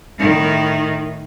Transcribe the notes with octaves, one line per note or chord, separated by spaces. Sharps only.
A2 D#3